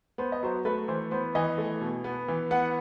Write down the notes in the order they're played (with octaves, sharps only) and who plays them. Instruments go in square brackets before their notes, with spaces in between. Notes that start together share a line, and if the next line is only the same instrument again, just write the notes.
[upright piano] B3 C5
D#5
F#3 C5
A3 B4
E3 C5
B3 C5
E3 D#5
A3
B2
B3
E3
B3 F#5